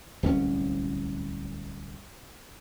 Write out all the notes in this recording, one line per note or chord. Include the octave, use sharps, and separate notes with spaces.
D1 C2 C#4